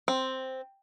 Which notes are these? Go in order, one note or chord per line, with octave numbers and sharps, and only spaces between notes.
C4